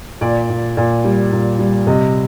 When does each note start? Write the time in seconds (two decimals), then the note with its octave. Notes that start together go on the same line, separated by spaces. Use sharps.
0.21 A#2 D5
0.50 A#2
0.77 A#2
1.04 G3
1.32 A#2
1.59 G3
1.87 C3 D#5